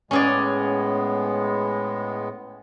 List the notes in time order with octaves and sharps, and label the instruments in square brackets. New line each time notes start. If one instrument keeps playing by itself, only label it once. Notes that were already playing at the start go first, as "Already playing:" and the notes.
[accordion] A2 G#3 B3 [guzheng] C#4 G#4 D5